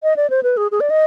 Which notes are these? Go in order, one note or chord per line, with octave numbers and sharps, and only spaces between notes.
D#5
D5
C5
B4
G#4
G#4
D5
D#5